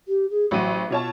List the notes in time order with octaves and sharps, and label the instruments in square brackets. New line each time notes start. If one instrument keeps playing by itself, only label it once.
[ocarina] G4
G#4
[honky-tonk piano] A1 F#3 D#7 [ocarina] C5
[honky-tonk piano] B2 C#5 A5 [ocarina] F4